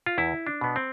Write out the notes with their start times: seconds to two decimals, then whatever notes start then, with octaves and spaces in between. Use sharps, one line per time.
0.06 F4
0.18 E2 E4
0.47 D4
0.61 B2 B3
0.76 C4